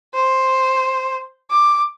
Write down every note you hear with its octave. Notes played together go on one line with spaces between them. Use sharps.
C5
D6